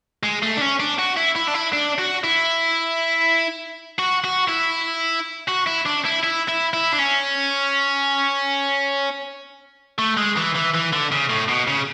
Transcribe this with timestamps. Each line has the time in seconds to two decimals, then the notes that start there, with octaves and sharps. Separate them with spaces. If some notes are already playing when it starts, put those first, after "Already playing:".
0.23 G#3
0.43 A3
0.57 D4
0.61 C#4
0.80 D4
0.99 F#4
1.17 E4
1.36 E4
1.48 D4
1.55 E4
1.73 D4
1.99 F#4
2.24 E4
3.99 F#4
4.24 F#4
4.49 E4
5.48 F#4
5.67 E4
5.86 D4
6.06 E4
6.24 E4
6.49 E4
6.73 E4
6.93 D4
6.99 C#4
9.99 A3
10.17 G#3
10.36 E3
10.55 E3
10.74 E3
10.93 D3
11.12 C#3
11.30 A2
11.49 B2
11.68 C#3